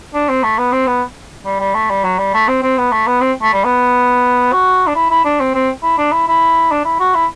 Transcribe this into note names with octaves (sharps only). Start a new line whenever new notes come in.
D4
C4
A3
B3
C4
B3
G3
G3
A3
G3
F#3
G3
A3
C4
C4
B3
A3
B3
C4
A3
G3
B3
F#4
D4
E4
E4
D4
C4
C4
E4
D4
E4
E4
D4
E4
F#4
E4